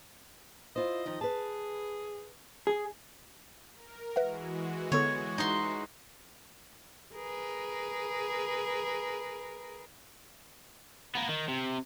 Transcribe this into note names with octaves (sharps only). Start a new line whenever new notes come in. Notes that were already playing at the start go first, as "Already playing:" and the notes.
E4 F4 C5 D#5
D#3 F3 D#4
G#4 B4 A5
G#4
A#4
E3 G#3 F#4 B4 E5 F#5
D3 B3 A4 C#5
D#4 C6
G#4 A#4 B4
A#3 B3
D#3
C3